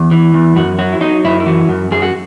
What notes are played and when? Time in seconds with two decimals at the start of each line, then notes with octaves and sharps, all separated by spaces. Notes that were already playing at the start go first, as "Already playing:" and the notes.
Already playing: E2
0.11 E3
0.34 E2
0.56 F#2 F#4
0.79 F#3 F#4
0.92 E4
1.01 F#3 D#4
1.24 F#2 E4
1.40 E4
1.46 E3 F#4
1.69 F#2
1.91 F#2 G#4
2.02 F#4